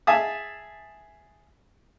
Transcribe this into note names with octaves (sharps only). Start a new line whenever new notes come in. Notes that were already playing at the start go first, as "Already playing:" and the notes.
G#4 E5 A5 D#6